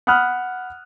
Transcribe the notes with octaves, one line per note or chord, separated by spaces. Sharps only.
F#5 B5 D#6 F6 F#6